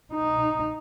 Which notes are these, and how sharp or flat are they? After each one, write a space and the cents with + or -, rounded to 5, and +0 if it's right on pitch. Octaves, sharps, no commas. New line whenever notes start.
D#4 -5